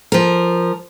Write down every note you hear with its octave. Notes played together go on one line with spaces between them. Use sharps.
F3 A#4